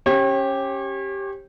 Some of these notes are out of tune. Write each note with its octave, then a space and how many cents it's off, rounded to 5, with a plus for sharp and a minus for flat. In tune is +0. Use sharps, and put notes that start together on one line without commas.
C#4 -10 G4 +0 C#5 -40